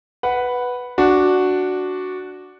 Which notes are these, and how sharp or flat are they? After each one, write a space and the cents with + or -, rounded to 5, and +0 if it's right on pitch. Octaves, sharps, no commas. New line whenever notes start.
B4 +0 F#5 +0
D4 +0 F#4 +0